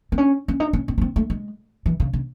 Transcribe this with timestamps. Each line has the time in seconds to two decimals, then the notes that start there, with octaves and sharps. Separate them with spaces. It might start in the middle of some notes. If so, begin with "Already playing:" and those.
0.12 C4
0.18 C#4
0.48 C#4
0.60 D#4
0.73 C#4
0.88 C4
0.98 C#4
1.01 C4
1.16 A3
1.30 G#3
1.86 E3
2.00 C#3
2.13 C#3